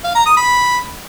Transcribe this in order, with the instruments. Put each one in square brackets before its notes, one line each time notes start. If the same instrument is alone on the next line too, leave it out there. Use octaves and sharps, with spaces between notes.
[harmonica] F5
A#5
D#6
B5